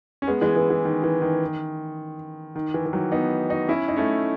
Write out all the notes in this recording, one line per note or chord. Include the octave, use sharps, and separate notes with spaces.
C#4
G#3 B3
E3 G#3
E3
E3
D#3
E3
D#3
D#3
E3
E3
D#3 F#3
B3 D#4
D#4 F#4
C#4 E4
D#4
A3 C#4